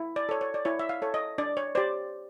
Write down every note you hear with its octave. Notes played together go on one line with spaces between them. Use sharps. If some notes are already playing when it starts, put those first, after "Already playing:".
Already playing: E4
D5
A4 C#5
C#5
D5
E4 C#5
E5
F5
A4 C#5
D#5
D4 D5
C#5
G4 C5 D5